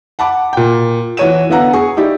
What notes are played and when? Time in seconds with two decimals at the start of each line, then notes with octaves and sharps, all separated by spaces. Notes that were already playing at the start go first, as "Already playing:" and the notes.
0.19 F#5 A5 B5 D6
0.53 A#2 G5
1.17 E3 F#4 C#5 D#7 E7
1.50 D3 B3 E4 F5 F#5 A#5
1.73 G#4 C#6
1.97 D#4 E4 G4 D5